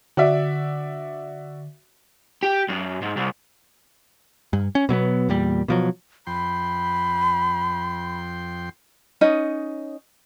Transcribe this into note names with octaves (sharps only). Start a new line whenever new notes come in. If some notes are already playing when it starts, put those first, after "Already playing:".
D3 F#4 D5 E5
G4
F#2
G#2
C2
G2
C#4
B2 F#3 A#3 B3
E2 A#2 G3
B2 F3 F#3
F2 G5 B5 C6
C#4 D#4 D#5